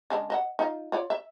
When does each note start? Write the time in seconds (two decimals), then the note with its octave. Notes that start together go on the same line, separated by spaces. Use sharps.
0.10 C#3 G#3 D4
0.30 D#5 E5 F#5
0.59 D#4 F4
0.92 F4 C#5 D5
1.10 E5